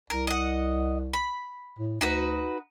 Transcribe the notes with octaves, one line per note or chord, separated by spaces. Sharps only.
C2 A#4
D#5 F#5
B5
A2
D2 D#4 F#4 B4